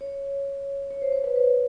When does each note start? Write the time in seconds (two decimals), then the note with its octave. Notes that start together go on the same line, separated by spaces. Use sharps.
0.01 C#5
0.91 C#5
1.02 C5
1.12 C5
1.24 B4
1.36 B4